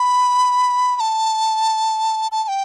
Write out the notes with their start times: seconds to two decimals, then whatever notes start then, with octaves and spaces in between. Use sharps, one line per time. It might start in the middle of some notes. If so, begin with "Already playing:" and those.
Already playing: B5
0.96 B5
1.00 A5
2.32 A5
2.44 A5
2.48 G5